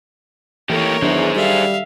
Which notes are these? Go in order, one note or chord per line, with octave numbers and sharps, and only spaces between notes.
E3 A3 A#3 G4 A4 A#4 C#5
E2 D#3 F#3 D4 G#4 C5
G3 F#4 A4 E5 F5